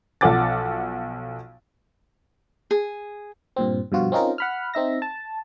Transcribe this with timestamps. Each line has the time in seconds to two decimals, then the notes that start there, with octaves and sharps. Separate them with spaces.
0.21 B1 F3 A4 F#5 D6 A6
2.71 G#4
3.56 G2 A#2 C4
3.92 G2 B2 F3 F4 F#4
4.12 C4 C#4 D#4 F4 A#4
4.38 F#5 B5 F6
4.74 C4 D#4 E5 A#6
5.02 A5